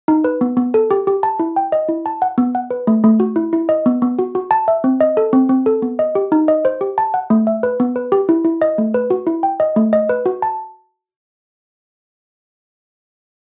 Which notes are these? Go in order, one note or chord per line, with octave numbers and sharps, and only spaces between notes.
D#4
B4
B3
B3
A4
G4
G4
A5
E4
G5
D#5
E4
A5
F#5
B3
F#5
B4
A3
A3
F#4
E4
E4
D#5
B3
B3
F#4
F#4
A5
E5
C4
D#5
A4
C4
C4
A4
B3
D#5
G4
D#4
D#5
C5
G4
A5
F#5
A3
E5
B4
B3
B4
G4
E4
E4
D#5
A3
B4
F#4
E4
G5
D#5
A3
D#5
B4
F#4
A5